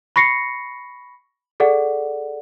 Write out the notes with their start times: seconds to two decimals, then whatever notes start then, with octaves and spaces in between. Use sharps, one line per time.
0.16 B5 C#6 A#6 C7 C#7
1.60 G#4 A4 D5 F#5